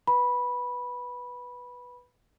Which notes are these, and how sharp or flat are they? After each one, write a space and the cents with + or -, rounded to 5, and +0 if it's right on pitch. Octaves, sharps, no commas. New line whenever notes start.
B4 -5 B5 -10